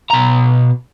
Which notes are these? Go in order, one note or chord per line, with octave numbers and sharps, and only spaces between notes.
B2 A#5